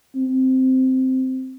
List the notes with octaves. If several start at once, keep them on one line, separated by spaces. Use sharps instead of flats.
C4